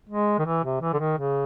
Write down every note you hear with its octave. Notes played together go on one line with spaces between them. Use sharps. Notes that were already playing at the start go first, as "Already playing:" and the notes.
G#3
D#3
E3
C3
E3
D3
D#3
C#3